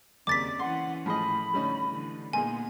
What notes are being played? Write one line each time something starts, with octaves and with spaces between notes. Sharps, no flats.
D#2 C#3 C4 D5 D6 A6 B6
E3 C#4 F#5 C6
A2 F3 G#4 D#5 B5
D3 G3 A3 C#4 D#4
D3 E3
A#2 A#3 B3 D#4 G#4 G#5 C6